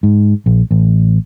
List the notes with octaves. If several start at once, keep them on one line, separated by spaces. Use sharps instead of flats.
G#2
A#1
A1